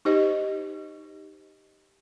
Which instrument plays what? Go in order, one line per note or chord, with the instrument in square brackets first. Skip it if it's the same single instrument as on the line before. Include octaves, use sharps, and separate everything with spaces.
[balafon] D#4 G4 C5 D#5